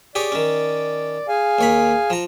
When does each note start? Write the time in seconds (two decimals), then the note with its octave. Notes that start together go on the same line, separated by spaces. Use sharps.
0.15 G4 G#4 C#5 D5
0.32 D#3 C#4
1.28 G#4 F5 G#5
1.59 D#2 C#5 B5
2.10 F3 A#5